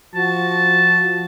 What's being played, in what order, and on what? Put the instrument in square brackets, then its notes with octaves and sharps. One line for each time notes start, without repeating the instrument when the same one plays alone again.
[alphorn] F3 [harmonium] F#4 [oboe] A5